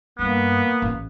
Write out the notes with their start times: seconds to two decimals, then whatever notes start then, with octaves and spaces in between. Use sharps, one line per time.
0.19 G2 A#3 B3
0.82 A1